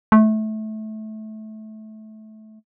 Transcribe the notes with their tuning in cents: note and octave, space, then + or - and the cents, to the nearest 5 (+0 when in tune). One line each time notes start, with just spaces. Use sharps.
A3 -20